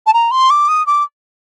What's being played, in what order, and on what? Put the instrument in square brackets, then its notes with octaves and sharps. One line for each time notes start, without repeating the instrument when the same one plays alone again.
[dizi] A5
A#5
C6
D6
D#6
D6